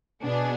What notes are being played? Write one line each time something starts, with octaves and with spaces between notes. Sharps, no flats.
B2 B3 D4 G#4